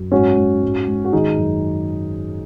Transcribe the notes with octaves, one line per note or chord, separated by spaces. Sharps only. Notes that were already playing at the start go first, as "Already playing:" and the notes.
Already playing: F#2
G#2 C#4 F#4
G#2
G#2
G#2
F#4
D#3 D#4 G#4
F#2